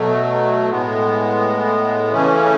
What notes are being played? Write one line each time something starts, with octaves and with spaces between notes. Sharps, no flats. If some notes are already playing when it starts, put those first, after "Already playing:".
Already playing: B2 F#3 A3
A2 G#3 B3
C#3 E3 A3 C#4